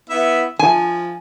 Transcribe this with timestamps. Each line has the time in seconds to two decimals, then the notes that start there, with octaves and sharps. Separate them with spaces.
0.10 B3 E4 E5
0.59 F3 G#5